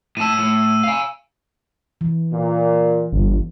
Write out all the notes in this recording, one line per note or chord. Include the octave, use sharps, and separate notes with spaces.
A2 A5 E6 D#7
A2
F5 G#5
E3
A#2
G1